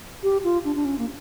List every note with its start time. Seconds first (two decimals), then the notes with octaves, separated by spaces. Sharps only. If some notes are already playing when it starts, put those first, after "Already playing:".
0.23 G4
0.44 F4
0.65 D4
0.76 D4
0.85 C#4
0.99 A#3